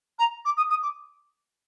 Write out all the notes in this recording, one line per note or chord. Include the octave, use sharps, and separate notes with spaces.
A#5
D6
D#6
D#6
D6